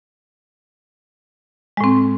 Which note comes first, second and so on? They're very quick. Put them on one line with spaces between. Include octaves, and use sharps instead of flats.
G#3 A2 C4